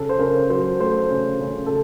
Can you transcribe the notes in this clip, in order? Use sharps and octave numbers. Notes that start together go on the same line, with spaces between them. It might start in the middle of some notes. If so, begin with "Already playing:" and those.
Already playing: C#3 A4
C5
C#3 A#4
F#3 C5
A3 C5
C#3
C#3
A4